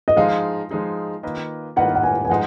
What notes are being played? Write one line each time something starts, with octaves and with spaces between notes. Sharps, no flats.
D#5
F3 G#3 D#4 G#4 F5
F3 G#3 D#4 G#4
D#3 A#3 F4 B4 D#5
D#3 A#3 F4 B4 D#5 F#5
F#5
G#5
G#5
F3 G#3 D#4 F#5